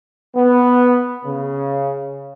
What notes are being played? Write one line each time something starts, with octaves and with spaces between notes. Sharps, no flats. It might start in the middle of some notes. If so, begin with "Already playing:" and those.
B3
C#3